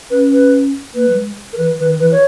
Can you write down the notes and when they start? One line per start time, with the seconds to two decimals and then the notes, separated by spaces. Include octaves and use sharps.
0.10 C#4 B4
0.32 B4
0.94 A#3 B4
1.09 F#3
1.16 G#3
1.52 A#4
1.57 E3 B4
1.74 E3
1.79 D#3 B4
1.99 E3 B4
2.11 C#5